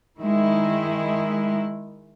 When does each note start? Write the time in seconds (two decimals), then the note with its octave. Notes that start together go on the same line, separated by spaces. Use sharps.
0.21 D#3 G#3 E4